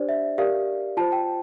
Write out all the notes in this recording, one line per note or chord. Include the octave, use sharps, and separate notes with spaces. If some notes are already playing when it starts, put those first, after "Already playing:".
Already playing: D4 G4 C5 D5
E5
G4 A#4 D5 F5
F4 C5 A5
G5